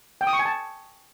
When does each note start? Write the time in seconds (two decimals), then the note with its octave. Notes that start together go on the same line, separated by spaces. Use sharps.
0.21 G5
0.27 D#6
0.33 C#6
0.39 G#5
0.45 A5